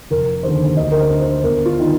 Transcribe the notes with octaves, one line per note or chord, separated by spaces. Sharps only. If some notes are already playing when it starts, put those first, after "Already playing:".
F1 A#4
D#2 D3 C5
D2 D#5
A#4
C5
D3
C5
G1 A#4
F4
D#3